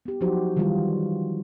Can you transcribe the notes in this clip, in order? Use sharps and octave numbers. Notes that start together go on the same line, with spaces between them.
B3 G4
F3 F#3 D#4 F#4 G4 C5
D#3 E3 F#3 G3 F4